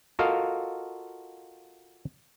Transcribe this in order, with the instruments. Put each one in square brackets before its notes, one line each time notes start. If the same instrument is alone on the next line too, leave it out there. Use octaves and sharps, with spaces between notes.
[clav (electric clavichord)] F4 F#4 A4 A#4 D#5 F5